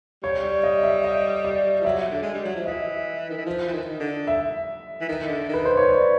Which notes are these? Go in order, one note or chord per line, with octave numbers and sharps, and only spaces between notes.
G3 C#5
D5
D#5
E5
D#5
D5
F3
F#3 E5
D3
G#3
G3
F#3
F3
E3 D#5
D#3
E3
F3
E3
D#3
D3
E5
E3
D#3
D3
D#3 B4
C5
C#5
D5